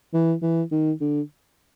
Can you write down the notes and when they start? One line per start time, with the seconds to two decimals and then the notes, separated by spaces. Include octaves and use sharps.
0.13 E3
0.42 E3
0.71 D#3
1.01 D3